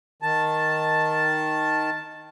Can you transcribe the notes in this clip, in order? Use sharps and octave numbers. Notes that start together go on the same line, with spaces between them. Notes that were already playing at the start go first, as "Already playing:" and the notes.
D#3 A5